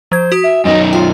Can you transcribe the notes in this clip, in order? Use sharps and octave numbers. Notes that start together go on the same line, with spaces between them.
F3 C5 G#6
F#4 D#6
E5
F#2 D#3 D#5
F4 G5